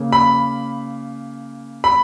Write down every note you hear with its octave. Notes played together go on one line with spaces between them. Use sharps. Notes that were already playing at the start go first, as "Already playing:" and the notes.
Already playing: C#3 A#3
B5
B5